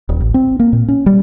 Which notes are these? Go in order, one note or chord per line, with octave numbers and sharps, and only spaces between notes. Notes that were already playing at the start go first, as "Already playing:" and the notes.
D#1
A1
C4
A#3
A#2
C#4
G3